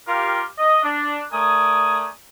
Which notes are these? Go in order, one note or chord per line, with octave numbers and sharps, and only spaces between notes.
F4 G4 A#4 F5
D#5
D4
A3 A#4 D5 G#5 D#6